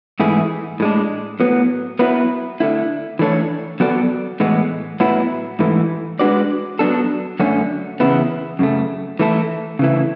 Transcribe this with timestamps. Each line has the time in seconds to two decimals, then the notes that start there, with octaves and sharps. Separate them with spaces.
0.20 G#2 E3 A3 E4 G#4
0.80 A2 G#3 D4
1.40 A2 F#3 B3
1.99 F#3 B3 E4 B4
2.60 D3 A3 E4
3.19 E3 A3 D4 A4 C#5
3.80 F#3 B3 F#4 A4 D5
4.40 A2 E3 G#3 B3
5.00 A2 F#3 B3 E4
5.59 G#2 E3 A3 E4
6.19 G#3 D4 F#4 B4 D5
6.79 F#3 B3 D4 A4
7.40 F#2 D3 F#3 A3 C#4
8.00 E2 C#3 B3 E4
8.59 F#2 C#3 A3
9.19 E3 A3 E4 A4
9.79 C#3 E3 A3 E4